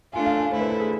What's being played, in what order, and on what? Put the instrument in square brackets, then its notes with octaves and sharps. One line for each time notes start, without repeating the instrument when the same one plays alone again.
[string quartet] A3 D4 F4 [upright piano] G#5
[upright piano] F5
G#5
[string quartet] D3 A3 E4 [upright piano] C5
[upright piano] B4
A4
G#4